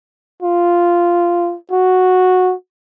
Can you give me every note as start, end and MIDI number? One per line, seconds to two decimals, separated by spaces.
0.42 1.56 65
1.72 2.54 66